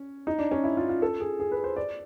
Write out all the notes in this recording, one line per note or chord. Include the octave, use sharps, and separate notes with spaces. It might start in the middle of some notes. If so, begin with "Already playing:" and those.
Already playing: C#4
D#4
D4
C#4
E4
F4
F4
A4
G#4
G#4
B4
C5
D5